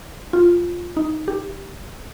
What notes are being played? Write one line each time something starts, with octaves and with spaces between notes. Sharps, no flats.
F4
D#4
G4